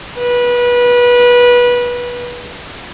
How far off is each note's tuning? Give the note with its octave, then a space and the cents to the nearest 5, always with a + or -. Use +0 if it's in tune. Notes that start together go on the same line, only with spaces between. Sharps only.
B4 -25